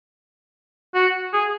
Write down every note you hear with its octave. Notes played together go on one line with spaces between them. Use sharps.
F#4
G#4